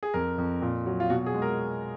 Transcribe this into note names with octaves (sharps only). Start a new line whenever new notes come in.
G#4
F2 A#4
F2
A#2
F#3
F4
B2 F#4
G#4
G#3
A#4